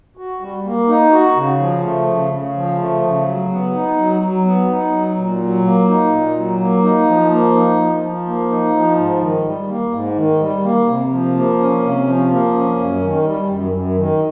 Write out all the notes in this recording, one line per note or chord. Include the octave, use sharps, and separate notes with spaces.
F#4
G3
A#3
D#4
F#4
C#3
F3
A3
C#3
C#3
F3
A3
C#3
F#3
B3
D#4
F#3
F#3
B3
D#4
F#3
A#2
F#3
A#3
D#4
A#2
F#3
A#3
D#4
F3
A#3
D#4
F3
F3
A#3
D#4
F3
G#2
D#3
G3
A#3
G#2
D#3
G3
A#3
C3
F3
A#3
C#4
C3
F3
A#3
C#4
F#2
D#3
G3
F#2
F#2
D#3